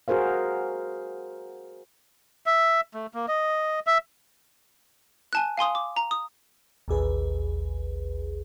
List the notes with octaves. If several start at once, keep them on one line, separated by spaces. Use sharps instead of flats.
F#4 G#4 A#4 C5 F5
E5
A3
A#3
D#5
E5
G#5 A5 F#6
F5 G#5 C6 D#6
D6
A#5
D#6
A1 D#2 G#4 B4